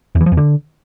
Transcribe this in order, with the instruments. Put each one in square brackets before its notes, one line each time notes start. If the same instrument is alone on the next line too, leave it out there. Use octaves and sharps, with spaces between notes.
[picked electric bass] E2
E3
F3
E2
D3